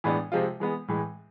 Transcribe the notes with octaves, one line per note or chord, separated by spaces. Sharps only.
A2 E3 G#3 B3 D4
C3 F3 G#3 C4 F4
E3 G#3 B3
A2 E3 G#3